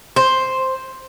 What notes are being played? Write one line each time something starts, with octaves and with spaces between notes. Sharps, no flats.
C5